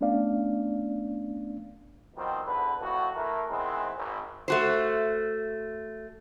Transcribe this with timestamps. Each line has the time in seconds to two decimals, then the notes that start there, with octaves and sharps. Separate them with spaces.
0.01 A3 B3 C#4 D4 D5 F5
2.15 B2 D#3 F3 G3 C4
2.45 E2 D3 B4
2.81 F2 A2 F#4
3.15 E3 A3 A#4
3.50 D#3 E3 G#3 B3 C4
3.95 G#1
4.48 A3 F#4 C5